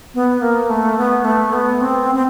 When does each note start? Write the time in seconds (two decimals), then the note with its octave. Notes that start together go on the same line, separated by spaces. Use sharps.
0.14 B3
0.42 A#3
0.70 A3
0.97 B3
1.25 A3
1.53 B3
1.81 C4
2.15 C4